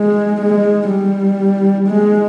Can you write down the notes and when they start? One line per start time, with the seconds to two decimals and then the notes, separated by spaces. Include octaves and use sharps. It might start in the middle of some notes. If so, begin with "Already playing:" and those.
Already playing: G#3
0.41 G#3
0.90 G3
1.87 G#3